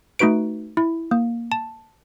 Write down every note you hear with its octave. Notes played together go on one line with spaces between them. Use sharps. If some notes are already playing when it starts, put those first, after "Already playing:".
A3 D#4 F#4 B4 D7
E4
A#3
A5